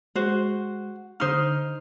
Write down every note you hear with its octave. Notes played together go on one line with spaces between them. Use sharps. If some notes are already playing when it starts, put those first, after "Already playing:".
G#3 F#4 C5
D3 D#4 C5 D#6 F6